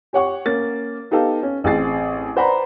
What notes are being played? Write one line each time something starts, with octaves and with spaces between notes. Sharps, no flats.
G4 C#5 F#5 C#6
A#3 C#4 A6
B3 D#4 G4 A4 F5
C#4
A1 C4 G#4 A6 C7
B4 C5 D5 F#5 A#5 B5